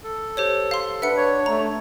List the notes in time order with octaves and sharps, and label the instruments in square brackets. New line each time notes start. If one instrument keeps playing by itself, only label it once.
[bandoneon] A4
[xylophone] G4 C5 C#5
F5 C6
[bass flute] D4 [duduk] B4 [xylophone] E5 F#5 C#7
[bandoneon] C#5
[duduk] A3 [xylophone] A#5